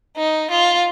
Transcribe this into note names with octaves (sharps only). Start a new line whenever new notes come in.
D#4
F4